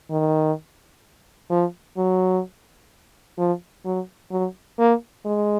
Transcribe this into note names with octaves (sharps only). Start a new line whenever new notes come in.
D#3
F3
F#3
F3
F#3
F#3
A#3
G#3